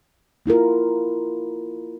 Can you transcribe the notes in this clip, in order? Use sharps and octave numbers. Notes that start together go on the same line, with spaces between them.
A#3 E4 F4 A#4